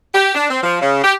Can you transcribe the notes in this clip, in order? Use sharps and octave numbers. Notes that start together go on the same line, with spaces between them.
G4
D4
C4
F3
C#3
G4